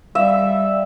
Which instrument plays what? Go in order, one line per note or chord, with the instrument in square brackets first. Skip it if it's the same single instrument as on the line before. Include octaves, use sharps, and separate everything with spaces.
[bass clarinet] G3 [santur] E5 [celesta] F5